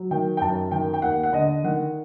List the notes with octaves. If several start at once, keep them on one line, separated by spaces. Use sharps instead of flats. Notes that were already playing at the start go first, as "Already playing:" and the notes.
Already playing: F#3
D#3 G5
G5
F#2 A5
D#3 G5
G5
D#2 F#5
F#5
D3 D#5
D#3 F#5